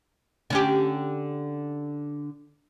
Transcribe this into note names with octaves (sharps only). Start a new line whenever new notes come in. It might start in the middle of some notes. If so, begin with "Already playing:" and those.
D3 C#4 G4